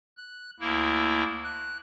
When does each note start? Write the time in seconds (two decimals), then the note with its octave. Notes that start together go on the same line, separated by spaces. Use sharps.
0.17 F#6
0.60 D2 A#3 E4
1.44 F#6